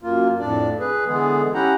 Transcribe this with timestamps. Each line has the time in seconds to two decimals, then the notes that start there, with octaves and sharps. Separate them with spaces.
0.03 F#2 A#3 F4
0.39 F2 A2 D4 D5
0.79 G#4 B4
1.06 D3 E3 G#3 B3 G#4
1.54 C#4 E4 G4 F#5 G5 A#5